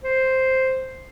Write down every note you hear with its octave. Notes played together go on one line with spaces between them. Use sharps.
C5